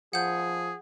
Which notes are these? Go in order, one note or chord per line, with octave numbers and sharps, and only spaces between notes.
F3 G#4 F#5 G6